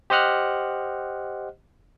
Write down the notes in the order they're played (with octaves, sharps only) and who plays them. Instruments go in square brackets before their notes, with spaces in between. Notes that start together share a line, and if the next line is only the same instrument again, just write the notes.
[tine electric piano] G4 C5 D#5 F#5 F6 F#6